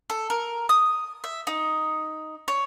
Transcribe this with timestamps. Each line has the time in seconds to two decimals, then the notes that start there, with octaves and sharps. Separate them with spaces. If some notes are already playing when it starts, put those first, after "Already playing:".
0.10 A4
0.30 A#4
0.69 D#6
1.24 E5
1.47 D#4
2.48 C#5